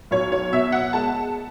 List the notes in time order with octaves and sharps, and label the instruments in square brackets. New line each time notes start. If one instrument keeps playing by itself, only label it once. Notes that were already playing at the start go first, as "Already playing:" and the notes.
[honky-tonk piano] B1 C#5
C#5
B2 E5
F#5
G#3 A5